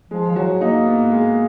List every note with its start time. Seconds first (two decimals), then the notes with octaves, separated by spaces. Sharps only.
0.11 F3 G#3
0.31 F3
0.36 F#3 F#4
0.61 A#3 D#4
0.86 B3
1.11 G#3